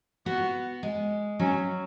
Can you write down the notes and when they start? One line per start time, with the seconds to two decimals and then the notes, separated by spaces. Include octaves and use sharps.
0.26 B3 F#4
0.83 G#3
1.39 F#3 C#4